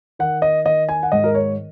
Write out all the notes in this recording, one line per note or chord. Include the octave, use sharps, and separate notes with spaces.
D#3 F#5
D#5
D#3 D#5
G#5
F#5
G#2 D#5
A#4
C#5